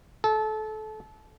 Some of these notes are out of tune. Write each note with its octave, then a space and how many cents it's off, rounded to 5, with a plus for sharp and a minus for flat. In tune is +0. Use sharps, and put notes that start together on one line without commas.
A4 -25